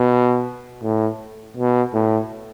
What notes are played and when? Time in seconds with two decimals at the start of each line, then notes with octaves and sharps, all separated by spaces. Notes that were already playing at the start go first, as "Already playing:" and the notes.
Already playing: B2
0.83 A2
1.57 B2
1.94 A2